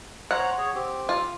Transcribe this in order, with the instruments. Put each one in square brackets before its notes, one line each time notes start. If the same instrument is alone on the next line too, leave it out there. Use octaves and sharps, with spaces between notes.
[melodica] C5 C#5 A#5 [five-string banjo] F#5
[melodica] G#4 C#5
C4 G4
[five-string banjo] F4